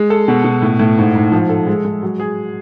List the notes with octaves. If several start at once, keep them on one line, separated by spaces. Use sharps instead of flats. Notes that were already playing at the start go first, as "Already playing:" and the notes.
Already playing: G#3
A4
B2
B2
A2
A2
G#2
G#2
F3
A4
G#3
G#3
F#3
G#4